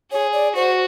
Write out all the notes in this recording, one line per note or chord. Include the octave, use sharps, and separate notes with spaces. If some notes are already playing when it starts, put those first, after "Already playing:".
G#4 C#5
D5
F#4 C5